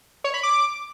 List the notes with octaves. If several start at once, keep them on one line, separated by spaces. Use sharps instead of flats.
C#5
B5
D6